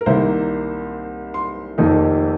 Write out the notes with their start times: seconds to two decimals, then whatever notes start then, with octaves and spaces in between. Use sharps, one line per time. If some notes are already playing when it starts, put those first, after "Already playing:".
0.01 A#4
0.06 C2 C3 D#3 A#3 C5
1.34 C6
1.78 F1 F2 D#3 A#3 D#4